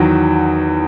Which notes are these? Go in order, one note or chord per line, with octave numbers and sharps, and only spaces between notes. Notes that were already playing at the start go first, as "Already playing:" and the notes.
Already playing: E2 D#3 F#3